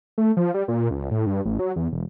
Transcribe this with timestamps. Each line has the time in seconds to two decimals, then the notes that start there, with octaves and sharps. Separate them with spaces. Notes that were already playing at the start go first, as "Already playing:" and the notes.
0.18 A3
0.37 F3
0.54 G3
0.68 A#2
0.91 C#2
1.11 A2
1.27 G2
1.45 A1
1.59 F#3
1.76 E2
1.92 E1